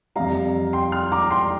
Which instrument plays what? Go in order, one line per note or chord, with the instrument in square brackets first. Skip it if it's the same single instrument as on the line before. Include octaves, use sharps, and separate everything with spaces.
[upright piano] F2 C3 G3 F5 A#5
G5 C6
C6 F6
A#5 D6
G5 C6